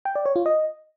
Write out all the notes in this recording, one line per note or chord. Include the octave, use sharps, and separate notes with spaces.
G5
D5
C#5
F4
D#5